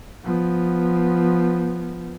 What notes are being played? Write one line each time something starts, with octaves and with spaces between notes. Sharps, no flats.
F3 B3